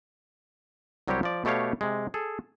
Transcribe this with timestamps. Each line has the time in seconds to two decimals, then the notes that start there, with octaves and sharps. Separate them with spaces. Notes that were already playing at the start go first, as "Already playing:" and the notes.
1.08 C2 F#3 G3 C4 G4 C#5
1.23 F3 D5
1.45 B2 A3 G4 C#5 F5
1.81 C3 G#3
2.14 G#4 A4